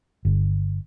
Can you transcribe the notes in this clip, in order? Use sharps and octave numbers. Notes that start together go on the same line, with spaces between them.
G1